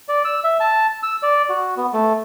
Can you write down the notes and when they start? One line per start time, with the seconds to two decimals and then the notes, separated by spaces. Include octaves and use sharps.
0.09 D5
0.25 E6
0.44 E5
0.60 A5
1.03 E6
1.23 D5
1.49 F#4
1.77 B3
1.93 A3